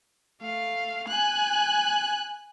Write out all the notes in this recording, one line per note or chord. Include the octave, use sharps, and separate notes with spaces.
A3 F5
G#5 F#6